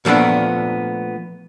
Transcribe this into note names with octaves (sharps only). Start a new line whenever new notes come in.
A#2 F3 A3 B3 D4